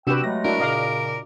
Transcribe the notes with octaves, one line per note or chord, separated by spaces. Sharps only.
C3 D4 F#4 G4 B4 G5 E6
F#3 G#3 A3 A#6
D4 E4 F#4 A#4
A#2 C#3 D#5 F5 A#5 D6